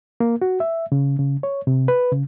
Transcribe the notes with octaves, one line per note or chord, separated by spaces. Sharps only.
A#3
F#4
E5
C#3
C#3
C#5
C3
B4
C#3